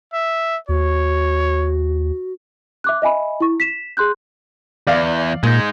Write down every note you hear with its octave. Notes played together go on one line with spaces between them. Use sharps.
E5
D#2 F#4 C#5
E5 D6 F#6
D#5 E5 G#5 B5
E4 C#6
B6 E7
G#4 C6 F#6 G6
E2 D5 F5
A#2 G#3 D#4